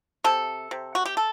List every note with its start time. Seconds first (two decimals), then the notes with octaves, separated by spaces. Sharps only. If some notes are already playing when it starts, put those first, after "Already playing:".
0.24 C3 A4
0.71 C3
0.95 F#4
1.05 G4
1.17 A4